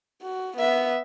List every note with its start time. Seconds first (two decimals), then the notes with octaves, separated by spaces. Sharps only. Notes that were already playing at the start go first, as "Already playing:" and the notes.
0.23 F#4
0.57 B3 E5